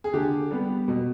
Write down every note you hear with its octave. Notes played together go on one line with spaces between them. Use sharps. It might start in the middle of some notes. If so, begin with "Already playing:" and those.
G#4
D3 G4
G3 B3
B2